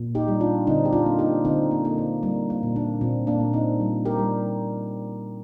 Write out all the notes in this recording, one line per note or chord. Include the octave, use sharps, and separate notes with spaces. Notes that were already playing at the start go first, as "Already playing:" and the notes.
Already playing: A#2
D#4 G4
G3
D4 F4
D3 C4 D#4
G4
D4 F4
A#3
D#4 G4
D3 C4 D#4
A#3
A#3
A#3
G3 A#3
A#3
A#2
A#3 D4
A#2 C4
A#3 D4
A#2
C4 D#4
G3
G4 A#4
G3